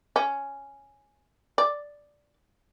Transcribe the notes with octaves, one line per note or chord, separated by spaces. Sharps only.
C#4
D5